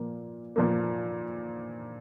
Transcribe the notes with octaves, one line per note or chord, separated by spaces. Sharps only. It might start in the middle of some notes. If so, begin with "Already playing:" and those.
Already playing: A#2 F3 A#3
A#2 F3 A#3